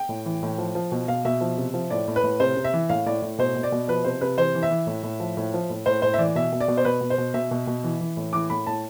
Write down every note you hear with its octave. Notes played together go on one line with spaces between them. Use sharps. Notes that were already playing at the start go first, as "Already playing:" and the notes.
Already playing: G5
A2
E3
A2
F3
F3
B2
B2 F5
B2 E5
F3
C3
F3
A2 D5
A2
B4
A2
C3 C5
C3
E5
E3
A2 F5
A2 D5
A2
B2 C5
B2
D5
B2
F3 B4
C3 C5
C3 B4
E3 C5
E3
E5
E3
A2
A2
F3
A2
F3
A2
A2 C5
A2 C5
E5
E3 D5
B2 E5
B2
D5
B2
C5
B2 B4
B2
C5
B2
B2 E5
B2
B2
E3
E3
A2
E3 D6
A2 B5
A2 A5